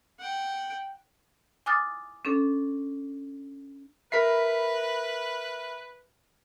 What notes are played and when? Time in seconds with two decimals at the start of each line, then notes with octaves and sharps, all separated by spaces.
0.20 F#5 G5
1.66 G#5 D6 D#6 F6 F#6 A6
2.25 C#4 D4 A4
4.12 A#4 B4 E5 B5 B6 C7